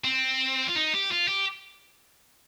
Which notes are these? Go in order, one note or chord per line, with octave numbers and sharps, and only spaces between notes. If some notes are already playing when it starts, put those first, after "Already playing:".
C4
F4
D#4
G4
F4
G4